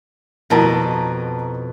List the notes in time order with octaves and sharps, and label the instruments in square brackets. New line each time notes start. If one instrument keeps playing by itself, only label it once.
[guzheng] F2 B2 D#5 [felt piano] E4 F#4 [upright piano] A#4 A5 A#5